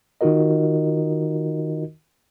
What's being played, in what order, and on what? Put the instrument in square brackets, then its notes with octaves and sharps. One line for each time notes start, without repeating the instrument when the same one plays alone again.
[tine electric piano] D#3 D#4 F4 F#4 A#4 D#5